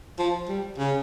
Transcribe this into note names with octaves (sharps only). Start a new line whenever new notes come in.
F3
G3
C#3